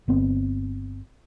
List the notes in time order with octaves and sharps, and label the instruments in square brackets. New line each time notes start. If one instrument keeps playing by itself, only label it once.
[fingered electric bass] G1 B3 C4